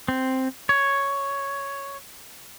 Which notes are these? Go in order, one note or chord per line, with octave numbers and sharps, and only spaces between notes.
C4
C#5